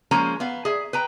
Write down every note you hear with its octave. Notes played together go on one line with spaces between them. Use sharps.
F3 G#3 A#3 C#4 A#5
B3 F5
G#4 E5
B4 G5 A#5